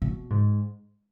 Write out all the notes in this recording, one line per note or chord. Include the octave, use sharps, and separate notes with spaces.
B2
G#2